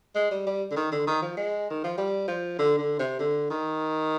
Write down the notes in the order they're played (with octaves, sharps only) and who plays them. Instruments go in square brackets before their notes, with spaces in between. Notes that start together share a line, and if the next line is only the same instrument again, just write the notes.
[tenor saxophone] G#3
G3
G3
D3
D#3
D3
D#3
F3
G#3
D#3
F3
G3
F3
D3
D3
C3
D3
D#3